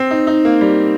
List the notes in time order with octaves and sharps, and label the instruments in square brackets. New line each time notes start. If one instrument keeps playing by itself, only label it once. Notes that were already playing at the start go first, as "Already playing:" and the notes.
Already playing: [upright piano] C4
D#4
D#4
A#3
G3